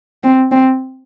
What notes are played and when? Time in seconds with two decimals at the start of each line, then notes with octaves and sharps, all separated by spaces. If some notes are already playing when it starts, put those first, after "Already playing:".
0.24 C4
0.52 C4